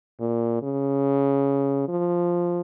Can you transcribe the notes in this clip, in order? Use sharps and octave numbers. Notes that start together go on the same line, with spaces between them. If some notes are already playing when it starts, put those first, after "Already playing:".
A#2
C#3
F3